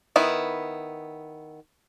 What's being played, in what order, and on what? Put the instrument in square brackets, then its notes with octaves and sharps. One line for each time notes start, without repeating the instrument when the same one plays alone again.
[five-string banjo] D#3 B3 E4